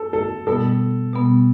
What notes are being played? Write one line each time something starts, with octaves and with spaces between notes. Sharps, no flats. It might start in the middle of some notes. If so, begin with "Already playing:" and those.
Already playing: A4
A4
B2 G3 B3 A4
B2 G3 B3